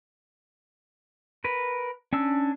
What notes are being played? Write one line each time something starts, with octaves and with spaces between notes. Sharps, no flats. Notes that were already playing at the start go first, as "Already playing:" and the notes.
A#4 B4
C#4 D4 E6